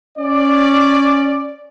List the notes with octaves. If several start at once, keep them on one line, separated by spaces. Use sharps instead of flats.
C#4 D5